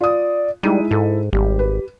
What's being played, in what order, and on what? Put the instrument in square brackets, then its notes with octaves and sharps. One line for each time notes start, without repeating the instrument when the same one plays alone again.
[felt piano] F4 D#6 [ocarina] D5
[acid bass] G3 [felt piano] G#3 D#4 D#7 [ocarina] E4
[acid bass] G#2 [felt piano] A4
[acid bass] G#1 [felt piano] G3 [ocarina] G4
[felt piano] B4